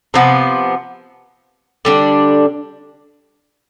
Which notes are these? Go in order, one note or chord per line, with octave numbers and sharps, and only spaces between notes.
C3 F3 B3
D3 G3 D4